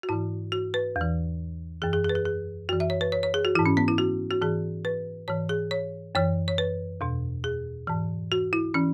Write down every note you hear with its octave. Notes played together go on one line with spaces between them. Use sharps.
F#4
G#2 E3 E4
F#4
B4
E2 E3
F#2 E3 G#4
G#4
G#4
B4
G#4
G#4
F#2 E3 F#4
E5
C#5
B4
C#5
C#5
G#4
F#4
G#2 E3 E4
C#4
B3
E4
F#4
F#4
G#2 E3 G#4
B4
G#2 E3 C#5
G#4
C#5
F#2 E3 C#5
C#5
B4
E2 B2
G#4
G#2 E3
F#4
E4
E3 C#4